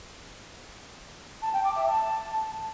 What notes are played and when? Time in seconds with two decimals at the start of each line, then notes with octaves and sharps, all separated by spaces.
1.42 A5
1.53 G5
1.64 D6
1.75 E5
1.86 A5